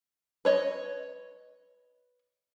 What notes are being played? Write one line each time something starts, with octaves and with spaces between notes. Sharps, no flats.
B4 C#5 D#5